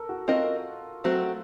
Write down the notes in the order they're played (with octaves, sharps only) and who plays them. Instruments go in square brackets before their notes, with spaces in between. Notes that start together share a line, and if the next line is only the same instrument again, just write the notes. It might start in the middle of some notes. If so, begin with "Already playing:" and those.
Already playing: [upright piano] A4 A#4
F#4
[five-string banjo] C4 F#4 A#4 D#5 [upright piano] F4
[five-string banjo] F#3 A3 C4 F#4